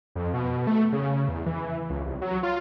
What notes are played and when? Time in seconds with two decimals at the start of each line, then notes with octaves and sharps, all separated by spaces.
0.15 F2
0.34 B2
0.67 A3
0.92 C#3
1.29 E2
1.46 E3
1.90 C#2
2.06 C2
2.22 F#3
2.43 F4